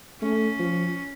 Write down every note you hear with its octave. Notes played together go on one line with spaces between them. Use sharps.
A3 C#4
F3